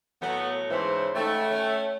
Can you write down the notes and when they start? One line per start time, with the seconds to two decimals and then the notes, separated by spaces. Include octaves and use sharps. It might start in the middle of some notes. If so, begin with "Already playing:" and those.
0.22 A2 F#3 A3 B3
0.70 G#2 C#3 E3 C4 C#4 C5
1.15 G#2 C#3 A3 G5
1.51 C#4